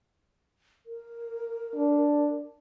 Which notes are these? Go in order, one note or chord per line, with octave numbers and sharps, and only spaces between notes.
A#4
D4